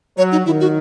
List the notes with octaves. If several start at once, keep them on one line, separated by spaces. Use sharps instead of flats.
F#3 C#5
D#4
D#3 E4
F#4